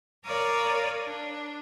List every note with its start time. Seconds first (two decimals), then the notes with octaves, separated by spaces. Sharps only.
0.24 A#4 C#5 D5 F5 A#5 D#6
1.06 D4